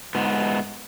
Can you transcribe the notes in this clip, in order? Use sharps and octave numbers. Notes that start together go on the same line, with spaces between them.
G#2 B3